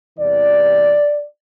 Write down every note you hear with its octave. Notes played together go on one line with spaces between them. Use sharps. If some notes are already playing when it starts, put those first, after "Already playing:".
E2 C3 E3 G3 D5